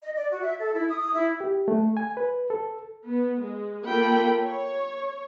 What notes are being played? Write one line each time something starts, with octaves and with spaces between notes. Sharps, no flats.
D#5
D5
F#4
E5
A4
E4
D#6
D#6
E4
G4
A3
G#5
B4
A4
B3
G#3
A#3 F4 A4 G5 B5
C#5